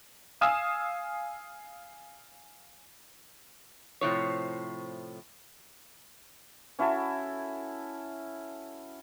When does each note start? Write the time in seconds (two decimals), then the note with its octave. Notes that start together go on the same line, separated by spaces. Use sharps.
0.41 F5 G#5 D#6 E6 E7
4.01 A2 C3 F3 C#5
6.79 C#4 E4 F#4 A4